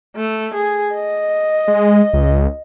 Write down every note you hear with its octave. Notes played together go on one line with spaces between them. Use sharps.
A3
G#4
D#5
G#3
C#2